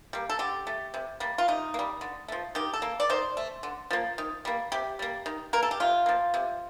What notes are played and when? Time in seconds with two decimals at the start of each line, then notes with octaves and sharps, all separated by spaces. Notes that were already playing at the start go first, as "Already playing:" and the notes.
0.13 G3 A#3
0.29 A4
0.39 D3 G4
0.67 A3
0.94 C3
1.20 G3 A#3
1.38 F4
1.48 C3 D#4
1.74 A#3
1.79 G3
2.01 D3
2.28 F3 A3
2.55 D#3 G4
2.73 A4
2.82 A#3
3.00 D5
3.10 D#3 C5
3.37 A3
3.63 D3
3.91 F3 A#3
4.18 D#3
4.45 G3 A#3
4.72 C3 G4
4.99 G3 A#3
5.26 D#3
5.53 A#3 A#4
5.63 A4
5.71 G4
5.80 C3 F4
6.06 F3 A#3
6.34 C3